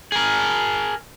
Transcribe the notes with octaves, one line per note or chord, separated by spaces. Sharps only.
G#4 A#4